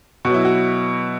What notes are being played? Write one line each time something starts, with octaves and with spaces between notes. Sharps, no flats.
B2 F#3 E4 F#4
F#4